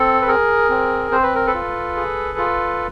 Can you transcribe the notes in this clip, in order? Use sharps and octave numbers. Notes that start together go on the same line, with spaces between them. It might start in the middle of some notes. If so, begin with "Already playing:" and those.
Already playing: C4 A4
B4
G#4 A#4
C4
C4 C5
B4
A#4
A4 B4
F4
G#4
F4